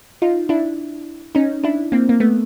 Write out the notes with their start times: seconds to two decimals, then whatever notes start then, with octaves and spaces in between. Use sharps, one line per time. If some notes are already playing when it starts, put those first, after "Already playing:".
0.22 D#4 F4
0.49 D4 E4
1.35 C#4 D#4
1.64 D4 E4
1.92 A#3 C4
2.09 A#3
2.20 A3 B3